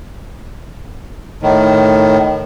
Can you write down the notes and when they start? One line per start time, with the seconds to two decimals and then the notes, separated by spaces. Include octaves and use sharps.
1.43 A2 D#3